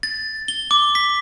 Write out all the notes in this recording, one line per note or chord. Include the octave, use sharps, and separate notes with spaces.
A6
G7
D6
B6